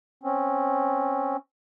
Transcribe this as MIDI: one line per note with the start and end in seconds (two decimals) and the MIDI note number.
0.23 1.37 60
0.23 1.37 61